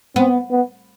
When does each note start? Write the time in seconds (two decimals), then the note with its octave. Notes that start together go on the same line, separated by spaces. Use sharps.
0.16 B3 C4
0.51 B3